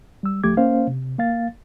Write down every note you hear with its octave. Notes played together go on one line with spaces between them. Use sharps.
G3 E6
C#2 F3 A3 G4 D6 G#6
A#3 C#4 C5 F5
C3
A#3 F5 A6